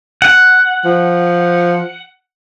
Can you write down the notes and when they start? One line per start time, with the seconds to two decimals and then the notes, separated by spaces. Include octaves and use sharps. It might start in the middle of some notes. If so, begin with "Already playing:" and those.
0.22 F#5
0.85 F3